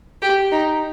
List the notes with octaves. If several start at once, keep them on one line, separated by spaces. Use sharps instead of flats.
G4
D#4